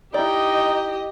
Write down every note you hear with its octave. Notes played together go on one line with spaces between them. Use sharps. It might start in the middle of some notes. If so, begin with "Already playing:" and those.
D#4 E4 G4 D5 D#5 G5